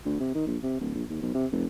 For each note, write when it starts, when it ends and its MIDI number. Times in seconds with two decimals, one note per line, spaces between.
0.05 0.19 38
0.20 0.33 48
0.35 0.44 51
0.47 0.57 34
0.63 0.78 48
0.80 0.93 26
0.95 1.04 34
1.09 1.19 39
1.22 1.35 35
1.35 1.46 48
1.52 1.66 29